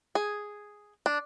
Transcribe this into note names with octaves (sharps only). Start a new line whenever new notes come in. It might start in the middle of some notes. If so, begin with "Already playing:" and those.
G#4
D4